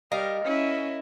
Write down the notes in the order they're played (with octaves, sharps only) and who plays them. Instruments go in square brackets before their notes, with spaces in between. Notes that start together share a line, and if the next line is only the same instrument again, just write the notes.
[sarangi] G3 [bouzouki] D#4 A#4 F5
[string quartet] C#4 [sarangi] E4